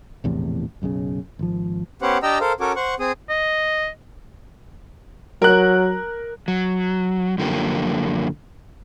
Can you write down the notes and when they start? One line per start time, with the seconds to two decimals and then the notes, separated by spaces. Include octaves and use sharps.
0.24 A#1 E2 A2 C3
0.82 F#1 B1 A2 C#3
1.39 G#1 F3
2.02 B3 C#4 G4 C5 F#5
2.23 D4 G4 D#5 G5 A#5 E6
2.40 A4 A#4 C5 F5
2.60 C#4 F#4 A4 A#4 C#5 D6
2.76 C5 F#5 C#6
3.00 C4 G#4 D#6
3.30 D#5
5.42 F#3 A#4 F#6
6.48 F#3
7.38 F#2 D3 F3 A#3 G4